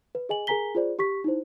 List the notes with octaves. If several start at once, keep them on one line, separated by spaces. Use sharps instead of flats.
B4
G#4 D#5 G#5 F#7
G#4 A#4 G#5 A#5 B6 G7
F4 G#4 C5 D5
G4 C#6 B6
D#4 E4 C5